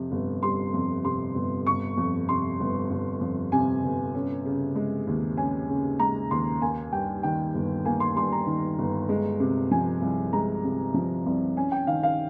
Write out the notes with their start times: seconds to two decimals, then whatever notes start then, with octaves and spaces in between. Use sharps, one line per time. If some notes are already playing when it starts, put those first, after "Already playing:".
Already playing: F2 C3
0.11 G1
0.43 G3 C6
0.74 F2
1.05 C3 C6
1.35 G1
1.67 G1 C#6
1.97 F2
2.29 C3 C6
2.60 G1
2.90 G1
3.21 F2
3.52 C3 G#5
3.84 G1
4.15 C#4
4.46 C#3
4.75 G#3
5.07 D#2
5.37 C#4 G#5
5.69 C#3
5.99 G#3 A#5
6.31 D#2 C6
6.62 A#3 G#5
6.93 G2 G5
7.23 D#3 G5
7.54 G1
7.85 A#3 G#5
8.00 C6
8.16 G2 C6
8.32 A#5
8.47 D#3
8.78 G1
9.09 G#3
9.40 C3
9.71 F3 G#5
10.02 C2
10.33 G#3 A#5
10.64 C3
10.94 F3
11.26 C2
11.57 C#4 G#5
11.72 G5
11.87 D#3 F5
12.03 F5